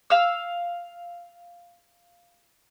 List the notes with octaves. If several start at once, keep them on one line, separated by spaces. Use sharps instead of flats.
F5 E6